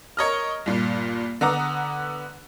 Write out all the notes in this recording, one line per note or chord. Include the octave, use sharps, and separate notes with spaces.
A#4 C#5 D#5 F6
G2 A#2
D3 B3 F#5 A#5 D6 D#6